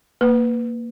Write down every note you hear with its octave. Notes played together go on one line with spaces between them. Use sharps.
A#3 B4